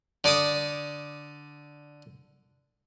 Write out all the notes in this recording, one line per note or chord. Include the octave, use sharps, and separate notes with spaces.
D3 D5 D6 D#6